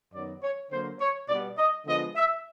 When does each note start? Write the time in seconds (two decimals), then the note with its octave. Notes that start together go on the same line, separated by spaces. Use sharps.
0.14 F#2 D#3 F#3 B3 D5
0.43 C#5
0.71 D3 F#3 A#3 C5
1.00 C#5
1.29 B2 G3 B3 D5
1.58 D#5
1.86 D3 F3 G#3 B3 D#5
2.15 E5